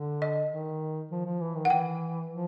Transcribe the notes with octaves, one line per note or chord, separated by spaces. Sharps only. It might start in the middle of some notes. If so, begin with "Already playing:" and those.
Already playing: D3
D#5
D#3
F3
F3
E3
D#3
F#5
E3 G5
F3